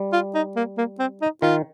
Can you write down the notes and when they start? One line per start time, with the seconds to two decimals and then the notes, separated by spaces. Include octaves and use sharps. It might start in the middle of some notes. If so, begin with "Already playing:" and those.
Already playing: G3
0.13 F4
0.35 D#4
0.56 A#3
0.77 A#3
0.99 C4
1.21 D#4
1.42 D#3 F4